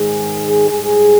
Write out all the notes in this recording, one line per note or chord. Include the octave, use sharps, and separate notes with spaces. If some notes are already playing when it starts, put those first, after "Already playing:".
Already playing: G#2 D#3 G#3 G#4
G#2 G3 G#4